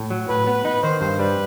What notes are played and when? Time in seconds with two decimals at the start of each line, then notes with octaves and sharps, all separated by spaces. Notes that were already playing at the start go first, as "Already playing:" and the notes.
Already playing: A2
0.10 F#3
0.29 A2 B4
0.47 B3
0.65 D#4 B4
0.83 D#3 C5
1.01 G2 C5
1.19 G3 B4